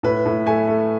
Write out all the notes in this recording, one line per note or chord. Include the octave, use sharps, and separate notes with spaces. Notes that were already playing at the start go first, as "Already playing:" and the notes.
A2 B4
A2
A3 G#5
A3